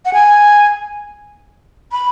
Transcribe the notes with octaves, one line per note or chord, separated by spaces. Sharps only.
F#5
G#5
B5